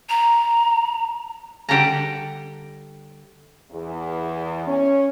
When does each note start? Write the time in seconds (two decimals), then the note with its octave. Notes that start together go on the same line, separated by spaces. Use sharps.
0.09 A#5
1.69 D3 G3 G4 F#5 A5 A#5
3.70 E2
4.66 C#4